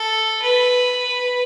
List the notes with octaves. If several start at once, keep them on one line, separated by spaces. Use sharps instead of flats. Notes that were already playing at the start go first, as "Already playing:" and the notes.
Already playing: A4
B4